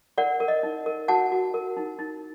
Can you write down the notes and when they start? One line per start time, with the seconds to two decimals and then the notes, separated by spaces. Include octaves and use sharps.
0.18 A#4 D5 F#5
0.40 A#4
0.48 D#5
0.63 D#4
0.86 A#4
1.08 F#4 F#5 A5
1.32 F#4
1.54 A#4
1.77 D#4
1.99 D#4